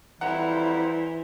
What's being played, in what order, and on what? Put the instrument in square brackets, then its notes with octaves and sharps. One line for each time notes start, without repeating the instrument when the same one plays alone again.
[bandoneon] F2 G3 A#5 [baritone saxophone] E3 [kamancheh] E4 C5 [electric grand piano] F#5